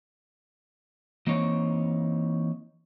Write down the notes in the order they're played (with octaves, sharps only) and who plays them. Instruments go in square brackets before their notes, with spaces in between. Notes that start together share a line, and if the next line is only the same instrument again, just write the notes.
[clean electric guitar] E3 A#3 C4 D#4 C#5